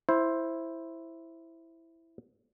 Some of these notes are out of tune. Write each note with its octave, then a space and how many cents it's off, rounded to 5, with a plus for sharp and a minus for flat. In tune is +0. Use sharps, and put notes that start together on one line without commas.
E4 +0 C5 +10